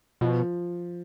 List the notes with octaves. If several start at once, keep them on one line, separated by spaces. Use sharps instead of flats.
B2 F3